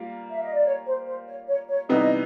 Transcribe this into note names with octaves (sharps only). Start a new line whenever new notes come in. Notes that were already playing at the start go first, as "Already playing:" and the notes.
Already playing: G3 A#3 F4
E5
D#5
D5
C#5
C5
C5
C#5
C#5
C#5
C3 E3 G3 B3 D#4 D#5